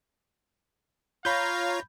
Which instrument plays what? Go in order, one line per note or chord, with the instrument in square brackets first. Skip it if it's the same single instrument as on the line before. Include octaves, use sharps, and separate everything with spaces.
[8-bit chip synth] F4 C#5 A#5 [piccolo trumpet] F5 [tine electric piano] B5 G6